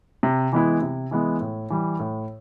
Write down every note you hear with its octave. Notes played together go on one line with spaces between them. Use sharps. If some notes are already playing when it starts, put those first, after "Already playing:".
C3
E3 G#3 B3 E4
C3
E3 G#3 B3 E4
A2
E3 G3
A2